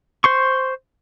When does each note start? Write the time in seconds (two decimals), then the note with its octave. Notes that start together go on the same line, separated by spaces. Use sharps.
0.24 C5 C6 C#6